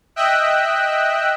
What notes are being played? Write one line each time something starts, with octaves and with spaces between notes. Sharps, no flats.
D#5 E5 G5 E6 F#6